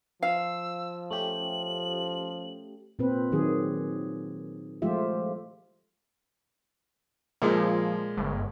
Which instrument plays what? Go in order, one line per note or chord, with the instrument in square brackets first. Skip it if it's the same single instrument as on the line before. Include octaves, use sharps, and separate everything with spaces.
[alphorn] F3 [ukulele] F5 [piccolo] E6
[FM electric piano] A3 C#4 G4 [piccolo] F#7
[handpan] A#2 C4 B4
D#3 F#3 G4 G#4
F3 G#3 A3 F4 G4 E5
[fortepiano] A#2 G#3 [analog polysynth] F3
[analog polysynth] G1